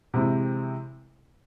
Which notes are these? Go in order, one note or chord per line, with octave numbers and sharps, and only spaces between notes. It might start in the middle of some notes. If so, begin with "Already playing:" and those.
C3 E3 G#3 C4 E4